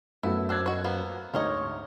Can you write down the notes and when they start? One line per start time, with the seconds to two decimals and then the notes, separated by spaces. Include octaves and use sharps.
0.23 F#2 A3 B3 E4 F#4
0.49 C4 D4 E6 F#6 G#6
0.66 F#4 C#5 D#5
0.84 F3 A#3 B3
1.34 D2 G#2 G4 A#4 C#5 D#5